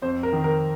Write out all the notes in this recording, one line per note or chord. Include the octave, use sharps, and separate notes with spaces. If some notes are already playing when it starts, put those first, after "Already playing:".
F2 C5
A#4
D#3
A#4